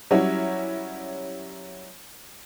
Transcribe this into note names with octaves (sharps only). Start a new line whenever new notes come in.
F#3 G3 C#4 E4 F#4